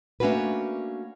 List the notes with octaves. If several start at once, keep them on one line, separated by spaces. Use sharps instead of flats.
A3 A#3 C#4 D4 F#4 B4